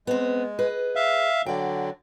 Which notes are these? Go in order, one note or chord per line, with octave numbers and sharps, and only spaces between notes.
G#3 B3 C4
G#4 B4 D#5
E5 F5
D3 F#3 D5 G5